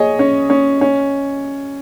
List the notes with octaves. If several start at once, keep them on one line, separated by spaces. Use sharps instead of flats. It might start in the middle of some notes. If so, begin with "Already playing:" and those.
Already playing: G#4 C#5 D#5
C#4
C#4
C#4